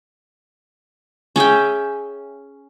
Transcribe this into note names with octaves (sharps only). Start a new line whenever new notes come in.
C#4 G#4 E5 G5